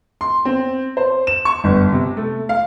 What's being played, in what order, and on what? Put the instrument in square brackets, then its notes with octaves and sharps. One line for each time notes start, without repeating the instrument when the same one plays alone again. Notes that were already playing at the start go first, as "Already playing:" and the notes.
[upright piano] C6
C4
C5
E7
C#6
G1
C3
A3
F5